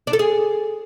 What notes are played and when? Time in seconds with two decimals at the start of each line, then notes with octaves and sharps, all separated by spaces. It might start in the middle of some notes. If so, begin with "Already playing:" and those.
0.07 D4
0.13 A4
0.19 G#4